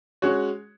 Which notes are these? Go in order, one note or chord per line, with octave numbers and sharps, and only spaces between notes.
G#3 C#4 F#4 C#5